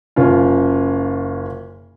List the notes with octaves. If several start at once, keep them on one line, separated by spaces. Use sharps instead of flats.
F#1 C#4 F4